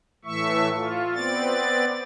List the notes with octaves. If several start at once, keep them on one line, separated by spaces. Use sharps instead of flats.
A2 E3 A3 E5 C#6
F4
B3 C4 D5 A6